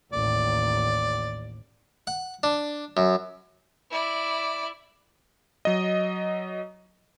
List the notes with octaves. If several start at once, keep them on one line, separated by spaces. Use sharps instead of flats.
A1 D#2 D5
F#5
D4
F#2
E4 D5
F#3 D#5